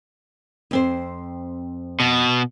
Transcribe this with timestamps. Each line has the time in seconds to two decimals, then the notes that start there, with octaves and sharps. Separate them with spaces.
0.71 F2 C4 C5
2.00 B2